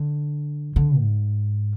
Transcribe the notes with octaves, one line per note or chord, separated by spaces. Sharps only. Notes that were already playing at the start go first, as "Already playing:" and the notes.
Already playing: D3
D3
G#2